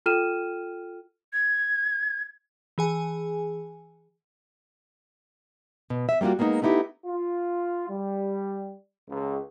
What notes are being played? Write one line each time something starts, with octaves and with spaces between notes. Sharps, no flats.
F4 A4 G5 F6 D#7 E7
G#6
E3 G#4 G#5
B2
E5
G3 A#3 D4 F4 F#4
G#3 A#3 B3 D4 D#4
A3 B3 D#4 E4 G4
F4
G3
C#2